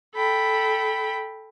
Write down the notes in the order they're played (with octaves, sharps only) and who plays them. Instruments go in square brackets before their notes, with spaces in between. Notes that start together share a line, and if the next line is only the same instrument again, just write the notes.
[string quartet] A4 G5 B5